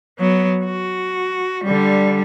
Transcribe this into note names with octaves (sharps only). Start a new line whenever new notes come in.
F#3 B3
F#4
D3 G3